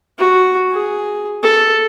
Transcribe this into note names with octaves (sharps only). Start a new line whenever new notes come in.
F#4
G#4
A4